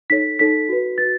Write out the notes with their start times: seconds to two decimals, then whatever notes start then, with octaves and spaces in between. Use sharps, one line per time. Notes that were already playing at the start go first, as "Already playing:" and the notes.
0.10 D#4 A4 C#5 B6
0.39 D#4 A4 C#5 B6
0.69 F#4 B4
0.98 F#4 B4 A6